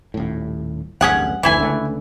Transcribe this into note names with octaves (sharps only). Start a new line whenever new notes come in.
D#1 A2
D1 A1 G2 C#4 G#4 F#5
F1 D2 E3 E4 G#5
C#2 D3 A3